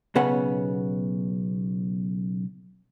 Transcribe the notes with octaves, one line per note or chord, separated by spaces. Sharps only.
B1 C#3 B3 C#4 F#5